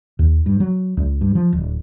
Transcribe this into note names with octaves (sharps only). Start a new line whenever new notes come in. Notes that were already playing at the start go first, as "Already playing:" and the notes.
D#2
G2
F#3
C#2
G2
F3
D1